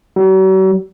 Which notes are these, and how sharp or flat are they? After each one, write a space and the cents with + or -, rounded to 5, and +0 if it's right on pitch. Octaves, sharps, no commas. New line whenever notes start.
F#3 +45